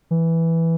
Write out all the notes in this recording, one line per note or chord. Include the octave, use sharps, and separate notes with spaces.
E3